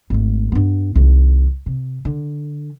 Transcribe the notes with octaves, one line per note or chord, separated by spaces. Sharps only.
G#1 A3
G2 B3
C2 D#3
C3
D3